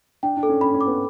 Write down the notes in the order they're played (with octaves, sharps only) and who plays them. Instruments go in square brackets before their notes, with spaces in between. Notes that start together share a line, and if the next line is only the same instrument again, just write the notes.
[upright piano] D4 [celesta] G5
[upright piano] D4
[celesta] A4
[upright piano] C#4
[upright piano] C#4 [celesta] B5
[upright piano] C#4
[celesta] D6
[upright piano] B3